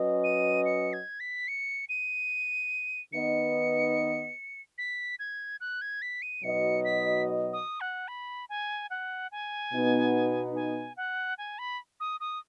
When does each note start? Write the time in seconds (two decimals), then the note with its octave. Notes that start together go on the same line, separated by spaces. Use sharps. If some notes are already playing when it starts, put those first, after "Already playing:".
Already playing: F#3 C#4 B4 D#5
0.24 D#7
0.66 C#7
0.93 G#6
1.20 B6
1.48 C#7
1.89 D#7
3.13 D#3 B3 D#4 B4 D#5 C#7
4.78 B6
5.19 G#6
5.61 F#6
5.82 G#6
6.02 B6
6.22 D#7
6.43 B2 F#3 D#4 B4 D#5 C#7
6.85 B6
7.53 D#6
7.81 F#5
8.08 B5
8.49 G#5
8.90 F#5
9.32 G#5
9.73 B2 B3 D#4
10.56 G#5
10.97 F#5
11.38 G#5
11.59 B5
12.00 D#6
12.20 D#6